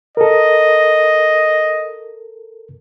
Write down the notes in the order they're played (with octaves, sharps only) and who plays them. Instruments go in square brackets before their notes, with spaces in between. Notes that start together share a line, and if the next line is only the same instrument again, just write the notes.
[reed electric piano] A4 A#4 [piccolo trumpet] D#5